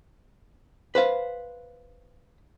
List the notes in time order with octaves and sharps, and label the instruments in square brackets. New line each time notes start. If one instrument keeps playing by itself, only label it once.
[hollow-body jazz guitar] B4 C5 F5